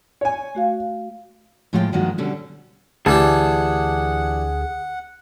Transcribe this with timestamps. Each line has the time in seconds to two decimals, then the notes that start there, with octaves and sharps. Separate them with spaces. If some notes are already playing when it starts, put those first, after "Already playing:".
0.21 C#5 G#5
0.55 A3 F#4 F5
1.73 A2 F3 G#3 F4 C5 G5
1.92 G2 D#3 F3 G#3 A#3 F#4
2.18 B2 D3 G3 C#4
3.06 D2 E3 D4 G4 G#4 F#5 A5